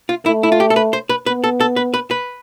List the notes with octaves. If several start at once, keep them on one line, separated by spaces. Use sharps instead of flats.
F4
A3 E4
E4
F4
G4
A4
B4
C5
B4
B3 B4
A4
A4
B4
B4
B4